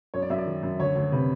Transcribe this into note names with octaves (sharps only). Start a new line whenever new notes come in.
F#2 C#5
D5
F#2 E5
D5
D#3
F#2
D2 C#5
D2
C3 B4